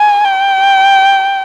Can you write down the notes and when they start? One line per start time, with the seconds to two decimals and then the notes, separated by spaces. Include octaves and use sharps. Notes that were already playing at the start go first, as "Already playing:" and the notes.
Already playing: G#5
0.24 G5